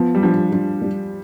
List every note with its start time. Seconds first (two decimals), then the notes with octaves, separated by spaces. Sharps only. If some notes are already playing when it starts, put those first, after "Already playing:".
Already playing: F3 B3
0.15 G3
0.22 F3 D4
0.52 F3 D4
0.81 G3